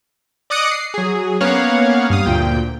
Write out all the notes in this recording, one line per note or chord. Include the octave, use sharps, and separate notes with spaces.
D5 D#5 D6 D#6 F#6 C#7
C7
F#3 G#4
A#3 B3 C#4 C#5 F5 F#5
G2 F5 D#6
D2 A#2 G5